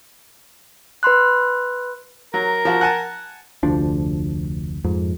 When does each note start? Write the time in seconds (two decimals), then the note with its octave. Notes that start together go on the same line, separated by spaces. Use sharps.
1.03 B4 B5 C6 F#6
2.34 F#3 A#4
2.65 F3 F#4
2.81 F#5 G#5 A5
3.63 F1 D2 F3 D4
4.84 F2 G#2